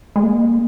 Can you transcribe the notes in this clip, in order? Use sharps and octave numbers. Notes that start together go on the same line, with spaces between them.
G#3
A#3